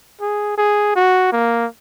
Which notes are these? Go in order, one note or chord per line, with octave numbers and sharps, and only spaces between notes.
G#4
G#4
F#4
A#3